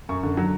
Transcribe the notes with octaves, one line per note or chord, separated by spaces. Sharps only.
F#2 C#6
D3
F#3